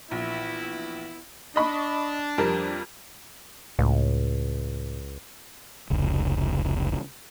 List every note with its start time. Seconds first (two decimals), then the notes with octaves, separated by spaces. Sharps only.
0.11 A#1 E3 B3 E4
1.56 D4 D#5 B5 C#6
2.38 F2 G3 A#4
3.79 C#2 A2
5.90 F1 C#2